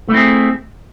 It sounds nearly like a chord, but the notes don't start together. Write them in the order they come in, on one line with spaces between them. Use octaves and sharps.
A3 E4 C4 G#4